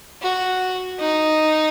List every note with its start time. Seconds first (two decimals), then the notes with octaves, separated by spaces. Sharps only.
0.22 F#4
1.00 D#4